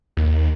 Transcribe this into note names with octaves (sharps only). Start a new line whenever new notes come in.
D#2